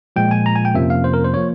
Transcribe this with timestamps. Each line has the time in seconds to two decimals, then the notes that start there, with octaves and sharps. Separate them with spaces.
0.16 A#2 F3 G#3 G5
0.31 G#5
0.46 A#5
0.56 G#5
0.65 G5
0.74 F2 C3 F3 A#3 C#4 E5
0.90 F5
1.04 C5
1.14 A#4
1.25 C5
1.34 F3 A#3 C#5